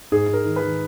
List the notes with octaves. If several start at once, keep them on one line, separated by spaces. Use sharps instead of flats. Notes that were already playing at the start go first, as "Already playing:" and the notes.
G#2 G#4
G#2
A#4
D#3
B4
D#3